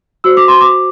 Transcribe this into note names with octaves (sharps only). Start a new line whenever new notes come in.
F#4 C5 E6
D6
C6
D6